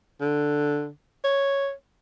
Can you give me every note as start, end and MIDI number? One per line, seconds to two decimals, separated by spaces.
0.21 0.88 50
1.24 1.72 73